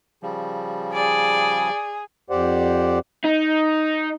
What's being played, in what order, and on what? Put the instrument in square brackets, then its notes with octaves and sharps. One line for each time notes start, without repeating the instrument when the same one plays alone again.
[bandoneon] C#3 F3 G3
[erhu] G#4 [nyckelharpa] D5
[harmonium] F2 G4 C5 D5 F#5
[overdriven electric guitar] D#4